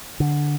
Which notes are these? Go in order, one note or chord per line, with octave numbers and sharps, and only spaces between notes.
D3